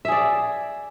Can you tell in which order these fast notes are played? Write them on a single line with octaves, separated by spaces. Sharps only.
E5 G#4 D5